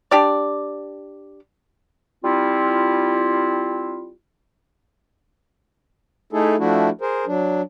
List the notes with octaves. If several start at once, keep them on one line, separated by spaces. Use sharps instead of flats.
D4 G4 D5
G3 C4 E4 F4
A3 D#4 E4 G#4 A4
F3 A3 D4 E4 F#4
G#4 A#4 C5
F#3 D4